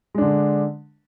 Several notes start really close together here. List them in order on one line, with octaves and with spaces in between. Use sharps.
G#3 D4 D3